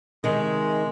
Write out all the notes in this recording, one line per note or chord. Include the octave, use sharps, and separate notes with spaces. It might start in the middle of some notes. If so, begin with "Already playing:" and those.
C3 D#3 G#3